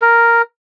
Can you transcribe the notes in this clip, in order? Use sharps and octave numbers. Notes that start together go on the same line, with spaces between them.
A#4